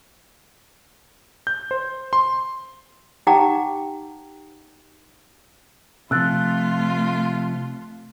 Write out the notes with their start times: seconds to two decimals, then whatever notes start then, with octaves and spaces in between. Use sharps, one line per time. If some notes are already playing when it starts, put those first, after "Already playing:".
1.47 G6
1.71 C5
2.13 C6
3.27 D#4 G4 F#5 G5 A#5 D6
6.11 C3 F3 A3 F4 E6 F#6 A6